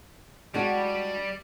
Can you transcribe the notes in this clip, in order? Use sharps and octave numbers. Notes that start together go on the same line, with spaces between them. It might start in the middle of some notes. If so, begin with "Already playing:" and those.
G3 G#3 D4 F#4